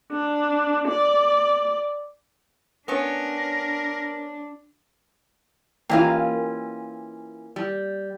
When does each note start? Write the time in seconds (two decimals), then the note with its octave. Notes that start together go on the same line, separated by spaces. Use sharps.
0.12 D4
0.88 D5
2.88 B3 C#4 D4 A#4 C#5
5.89 E3 A#3 C#4 F4 G4 D#5 F5
7.56 G3